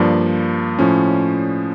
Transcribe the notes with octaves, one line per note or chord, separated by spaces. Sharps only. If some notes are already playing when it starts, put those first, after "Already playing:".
Already playing: G2 F3 A#3 D5
A2 F3 C#4